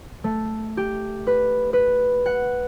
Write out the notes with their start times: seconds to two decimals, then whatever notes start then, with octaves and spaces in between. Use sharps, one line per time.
0.24 A3
0.77 G4
1.27 B4
1.73 B4
2.26 F#5